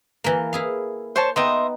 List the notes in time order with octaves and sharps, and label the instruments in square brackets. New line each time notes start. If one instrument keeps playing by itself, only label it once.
[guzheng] E3 A#3
E4 G#4 F5
[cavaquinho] C5 C#5 A5
[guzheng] B3 D#4 G5 [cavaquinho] D#5 E5 C6